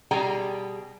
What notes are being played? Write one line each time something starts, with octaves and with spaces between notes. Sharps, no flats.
B2 G3 G#4 G5 G#5 A#5